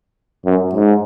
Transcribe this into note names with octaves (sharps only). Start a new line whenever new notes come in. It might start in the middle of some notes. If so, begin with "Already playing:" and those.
F#2
G#2